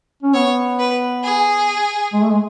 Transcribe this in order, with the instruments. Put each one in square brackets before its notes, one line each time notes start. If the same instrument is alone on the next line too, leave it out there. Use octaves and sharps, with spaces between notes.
[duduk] C#4
[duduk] B3 [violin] C#5
[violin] B4
G#4
[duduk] G#3
A3
G#3